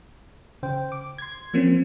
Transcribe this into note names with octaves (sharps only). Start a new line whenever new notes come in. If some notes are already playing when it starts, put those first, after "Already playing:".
C#3 C5 G5
D6
C6 G#6
F3 A#3 C4 C#4